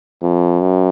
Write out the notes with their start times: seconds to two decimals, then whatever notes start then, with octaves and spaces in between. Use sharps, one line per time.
0.22 F2
0.61 F#2